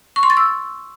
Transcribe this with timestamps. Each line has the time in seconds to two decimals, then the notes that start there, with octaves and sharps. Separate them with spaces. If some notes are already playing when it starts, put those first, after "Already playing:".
0.16 C#6
0.23 C6
0.30 A6
0.37 E6